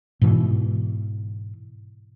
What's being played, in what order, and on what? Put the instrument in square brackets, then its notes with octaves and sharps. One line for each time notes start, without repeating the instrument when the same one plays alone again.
[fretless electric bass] G#2 B2 E3